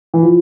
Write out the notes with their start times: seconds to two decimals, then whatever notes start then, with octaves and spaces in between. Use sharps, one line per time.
0.14 E3
0.23 F3